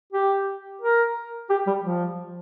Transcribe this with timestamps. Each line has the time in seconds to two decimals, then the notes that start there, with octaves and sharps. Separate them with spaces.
0.13 G4
0.81 A#4
1.50 G4
1.67 G3
1.84 F3